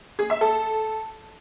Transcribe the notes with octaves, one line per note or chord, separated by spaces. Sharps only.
G#4
E5
A4